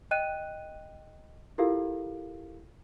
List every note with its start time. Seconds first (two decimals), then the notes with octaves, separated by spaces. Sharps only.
0.11 D#5 G5 F#6 D#7
1.58 E4 F4 G4 A4 A#4 F5